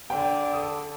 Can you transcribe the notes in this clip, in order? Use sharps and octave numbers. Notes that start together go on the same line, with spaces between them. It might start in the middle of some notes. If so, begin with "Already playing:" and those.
D3 G5
A4 D#6